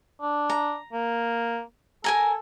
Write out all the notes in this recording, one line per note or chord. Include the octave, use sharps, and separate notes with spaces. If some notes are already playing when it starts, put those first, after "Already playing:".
D4
A#5
A#3
A4 A#4 G#5 A#5